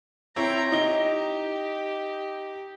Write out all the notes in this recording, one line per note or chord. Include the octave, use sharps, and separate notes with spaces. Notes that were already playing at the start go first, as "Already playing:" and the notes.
C4 E4 C#5 G5 A#5
D#4 G4 D#5 G7